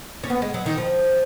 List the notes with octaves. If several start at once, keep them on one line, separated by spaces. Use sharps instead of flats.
C#4
B3
G#3
F#3
D#3
F3